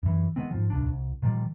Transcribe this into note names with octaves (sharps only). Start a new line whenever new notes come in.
F#2 E3
D#3 G#3 B3 C4
G#2 F3
D1 C2 D4
C2
A#2 D#3 F3 G3